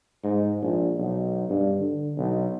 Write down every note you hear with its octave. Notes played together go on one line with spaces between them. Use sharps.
G#2
A#1
B1
G2
D3
B1